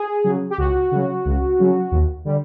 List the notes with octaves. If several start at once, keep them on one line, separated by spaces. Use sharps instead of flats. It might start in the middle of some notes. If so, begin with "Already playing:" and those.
Already playing: G#4
C#3 F#3
G4
C#2 F#4
C#3 F#3
C#2
C#3 F#3
D#2
D3 G3